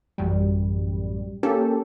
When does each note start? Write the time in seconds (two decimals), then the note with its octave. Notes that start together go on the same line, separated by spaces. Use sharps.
0.18 A1 F#2 G3
1.43 A#3 C#4 G4 A4